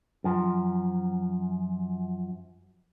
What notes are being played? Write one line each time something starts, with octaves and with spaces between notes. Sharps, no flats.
F#2 F3